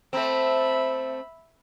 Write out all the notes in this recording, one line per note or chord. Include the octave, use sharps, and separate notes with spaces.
A3 C4 E5 B5